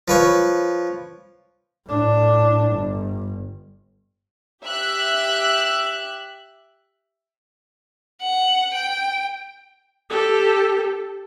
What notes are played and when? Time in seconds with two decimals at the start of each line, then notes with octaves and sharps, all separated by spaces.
0.08 F3 B4 C#5
1.87 A2 D4
2.72 G1
4.63 G4 E5 F#6
8.21 F#5
8.74 G5
10.10 G4 A4